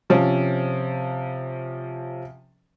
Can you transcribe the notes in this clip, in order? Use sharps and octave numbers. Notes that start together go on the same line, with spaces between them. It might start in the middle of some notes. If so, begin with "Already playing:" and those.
C3 F3 C#4